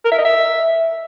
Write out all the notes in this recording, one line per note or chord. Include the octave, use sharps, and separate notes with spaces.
A#4
E5
D#5
E5